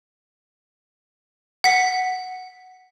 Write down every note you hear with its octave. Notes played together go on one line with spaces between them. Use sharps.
F#5 B6